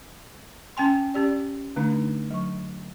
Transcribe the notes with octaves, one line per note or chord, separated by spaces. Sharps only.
C#4 G5 G#5 C6
C#4 G4 D5
D3 A3 D4 D#4
F#3 C#6